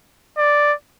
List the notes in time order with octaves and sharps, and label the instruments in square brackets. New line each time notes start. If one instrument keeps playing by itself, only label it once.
[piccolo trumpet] D5